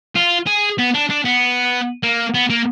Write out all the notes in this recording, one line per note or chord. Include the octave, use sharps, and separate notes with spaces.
F4
G#4
B3
D4
D4
B3
A#3
B3
A#3